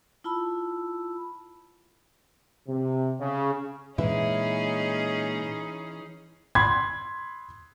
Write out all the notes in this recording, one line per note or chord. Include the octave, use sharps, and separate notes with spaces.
E4 F4 A5 B5 E6
C3
C#3
A#2 E3 G#3 C#4 D#4 E4 G#4
B5 C6 G#6